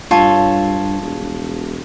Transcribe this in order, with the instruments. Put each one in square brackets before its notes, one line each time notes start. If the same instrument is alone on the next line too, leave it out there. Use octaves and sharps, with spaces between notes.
[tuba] G2 [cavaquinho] F4 A4 C#5
[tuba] E1